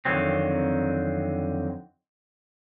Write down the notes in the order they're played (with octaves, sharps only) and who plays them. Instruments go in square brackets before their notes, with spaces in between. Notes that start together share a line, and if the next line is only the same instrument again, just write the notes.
[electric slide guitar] F2 D3 D#3 F#3 C4